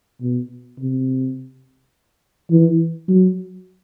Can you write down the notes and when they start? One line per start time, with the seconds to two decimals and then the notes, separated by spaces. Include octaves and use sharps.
0.21 B2
0.79 C3
2.51 E3
3.08 F#3